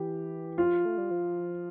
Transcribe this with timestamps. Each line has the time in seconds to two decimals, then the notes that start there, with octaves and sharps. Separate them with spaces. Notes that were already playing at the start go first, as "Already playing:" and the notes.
Already playing: E3 G4
0.58 F3 F4
0.85 A3
0.98 G3
1.11 F3